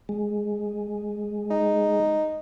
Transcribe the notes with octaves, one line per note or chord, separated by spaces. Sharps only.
G#3
D#4